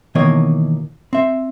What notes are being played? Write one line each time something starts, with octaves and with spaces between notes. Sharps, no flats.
B2 D#3 E3 A#3 C#5 D#5
C4 E5